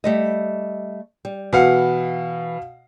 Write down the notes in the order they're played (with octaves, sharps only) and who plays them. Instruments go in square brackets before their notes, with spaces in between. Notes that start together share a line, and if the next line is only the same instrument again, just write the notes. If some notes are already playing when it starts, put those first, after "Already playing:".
[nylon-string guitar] G3 A3 D#5
G3
[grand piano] B2 F5 [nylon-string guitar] E3 B4 F#5